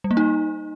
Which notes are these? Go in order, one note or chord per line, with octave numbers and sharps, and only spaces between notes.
G3
A#3
D#4